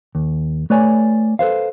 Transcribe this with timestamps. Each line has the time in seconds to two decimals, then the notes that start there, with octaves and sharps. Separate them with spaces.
0.15 D#2
0.70 A3 B4 C#5 D5 G#5
1.39 A4 B4 C5 F5